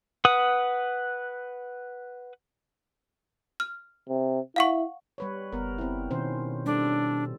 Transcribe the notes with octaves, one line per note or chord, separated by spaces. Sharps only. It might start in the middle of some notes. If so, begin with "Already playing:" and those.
B4 F#5 D#6
F6
C3
E4 F5 F#5 C#6
G3 B4 C#5
F#1 B3 A#4
C4 E4
B2 D#3 C#4 C5
G3 D4 A4